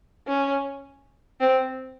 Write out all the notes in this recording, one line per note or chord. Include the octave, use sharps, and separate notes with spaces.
C#4
C4